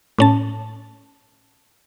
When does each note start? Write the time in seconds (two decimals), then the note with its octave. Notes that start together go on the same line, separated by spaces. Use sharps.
0.18 A2 C#4 A5